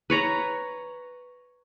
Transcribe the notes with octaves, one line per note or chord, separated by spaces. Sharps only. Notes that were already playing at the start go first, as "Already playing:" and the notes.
B4 C#5 A#5